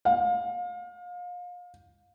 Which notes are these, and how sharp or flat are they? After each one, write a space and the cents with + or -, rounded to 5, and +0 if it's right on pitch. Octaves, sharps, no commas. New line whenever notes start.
F5 +30